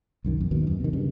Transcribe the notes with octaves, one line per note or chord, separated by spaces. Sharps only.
C2 F#2 D#3
A#1 F2
G#1 D#2 B2 D#3
F#2
C3 D#3
G2 C#3